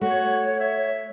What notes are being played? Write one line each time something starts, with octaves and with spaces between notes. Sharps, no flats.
A3 F#4 C#5
E5